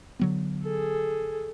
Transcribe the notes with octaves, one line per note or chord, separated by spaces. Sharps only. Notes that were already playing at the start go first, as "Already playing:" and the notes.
D3 F#3 B3
G#4 A4